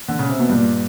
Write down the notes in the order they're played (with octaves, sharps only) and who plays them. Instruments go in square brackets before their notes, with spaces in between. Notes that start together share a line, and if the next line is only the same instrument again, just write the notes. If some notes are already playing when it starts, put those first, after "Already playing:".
[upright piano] D3
C#3
C3
B2
[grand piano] G2 [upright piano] A#2